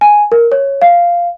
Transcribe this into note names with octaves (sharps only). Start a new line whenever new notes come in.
G#5
A#4
C#5
F5